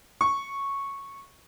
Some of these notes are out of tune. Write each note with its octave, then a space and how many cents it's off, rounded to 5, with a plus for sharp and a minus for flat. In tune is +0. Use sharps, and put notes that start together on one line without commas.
C#6 -5